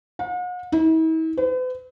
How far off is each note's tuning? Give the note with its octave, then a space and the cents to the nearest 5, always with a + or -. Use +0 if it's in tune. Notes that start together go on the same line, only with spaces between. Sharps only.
F#5 -45
E4 -45
B4 +45